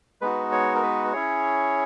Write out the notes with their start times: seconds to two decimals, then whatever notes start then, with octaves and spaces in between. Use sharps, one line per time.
0.21 G#3 B3 D#4 F#4 B4
0.52 C#5
0.75 A#4
0.83 B4
1.13 C#4 E4 G#4 C#5